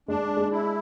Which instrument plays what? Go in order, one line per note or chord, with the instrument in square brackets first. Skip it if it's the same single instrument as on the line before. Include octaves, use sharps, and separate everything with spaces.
[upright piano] G#3 [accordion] D4
[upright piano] G#3
[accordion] E4